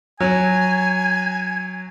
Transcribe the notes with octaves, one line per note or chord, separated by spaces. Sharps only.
F#3 G#5